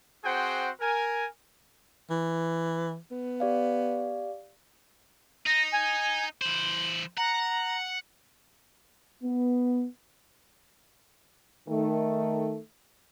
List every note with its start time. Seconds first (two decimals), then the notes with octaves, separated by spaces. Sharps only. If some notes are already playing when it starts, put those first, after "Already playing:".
0.25 C4 F#4 G#4 C5 F#5 G5
0.80 A#4 G#5
2.10 E3
3.11 B3
3.40 G4 D5 F5
5.46 D#4 A#6
5.72 G#5
6.42 E3 C5 F#7
7.17 F#5 A#5
9.23 B3
11.68 D#3 A3